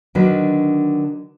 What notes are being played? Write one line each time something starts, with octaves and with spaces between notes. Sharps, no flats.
D3 D#3 F#3 D4 B4